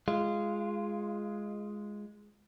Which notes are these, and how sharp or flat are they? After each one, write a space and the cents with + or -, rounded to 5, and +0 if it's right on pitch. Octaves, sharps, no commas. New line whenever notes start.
G#3 +0 F4 -15